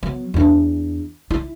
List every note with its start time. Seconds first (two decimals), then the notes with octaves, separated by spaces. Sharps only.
0.03 F#3 B3
0.34 E2 D4
1.31 E4